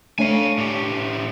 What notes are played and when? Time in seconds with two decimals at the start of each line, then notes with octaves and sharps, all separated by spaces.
0.19 A3 D4 C#5 F5 G#5
0.58 A2 G4